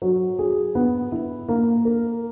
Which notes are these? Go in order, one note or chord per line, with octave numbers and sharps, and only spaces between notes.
F#3
G#4
B3
E4
A#3
A#4